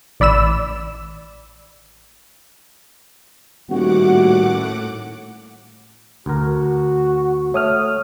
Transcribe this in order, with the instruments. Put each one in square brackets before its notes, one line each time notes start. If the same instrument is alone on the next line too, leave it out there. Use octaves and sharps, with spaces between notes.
[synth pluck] A1 D5 B5 E6 E7
[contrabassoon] D#1 [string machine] A2 F#5 D6 [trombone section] F#4
[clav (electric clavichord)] D2 A#4 [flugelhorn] F#4
[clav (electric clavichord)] A3 [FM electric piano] C#5 D#6 F6